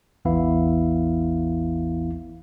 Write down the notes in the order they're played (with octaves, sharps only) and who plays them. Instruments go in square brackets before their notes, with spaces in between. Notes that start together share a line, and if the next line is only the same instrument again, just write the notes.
[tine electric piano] A1 E2 E3 B3 E4 F5